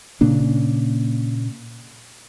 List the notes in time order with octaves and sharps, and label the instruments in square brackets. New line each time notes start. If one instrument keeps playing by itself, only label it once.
[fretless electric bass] A#2 C#3 A#3 D4